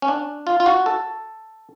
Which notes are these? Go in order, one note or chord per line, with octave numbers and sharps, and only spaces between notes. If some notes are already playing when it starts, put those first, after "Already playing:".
C#4
D4
F4
F4
F#4
A4